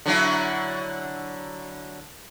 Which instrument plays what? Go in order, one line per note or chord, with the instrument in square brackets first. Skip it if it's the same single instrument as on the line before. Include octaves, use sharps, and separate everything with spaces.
[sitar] D3 F#3 E4